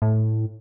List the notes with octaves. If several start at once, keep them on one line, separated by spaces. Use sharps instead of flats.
A2